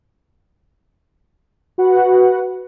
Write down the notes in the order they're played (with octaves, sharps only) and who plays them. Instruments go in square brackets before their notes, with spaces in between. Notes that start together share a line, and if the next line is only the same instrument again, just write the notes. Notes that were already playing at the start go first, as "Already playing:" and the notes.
[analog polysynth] F#4 B4 F#5